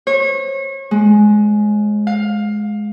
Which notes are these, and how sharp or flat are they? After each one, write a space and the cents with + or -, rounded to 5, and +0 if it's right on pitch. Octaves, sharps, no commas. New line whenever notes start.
C#5 -35
G#3 +15
F5 +15